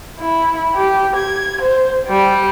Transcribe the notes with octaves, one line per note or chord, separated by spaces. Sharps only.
E4
G4
G#6
C5
G3